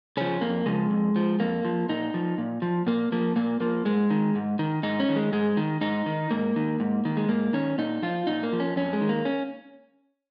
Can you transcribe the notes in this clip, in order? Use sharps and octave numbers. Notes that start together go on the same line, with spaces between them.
C#3 F3 C#4
F2 A#3
C#3 F3 G#3
F2
F3
F2 A#3
F3
A#2 D#4
F3
A#2
F3
A#2 A#3
F3 A#3
A#2 A#3
F3 A#3
G#2 G#3
D#3
G#2
D#3
G#2 D#4
C#4
D#3
G#3
G#2 G#3
D#3
G#2 D#4
D#3
G#2 A#3
D#3
G#2
D#3
G#3
G#2 A#3
D#3 C#4
A#2 D#4
F3 F4
A#2 D#4
A#3
F3
C#4
F2 C#4
G#3
D#3
A#3
C#4